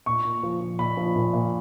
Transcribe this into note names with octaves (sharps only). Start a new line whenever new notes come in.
A#2 C#6
A#2
F3
F3
A#2 B5
F3
A#2
A#2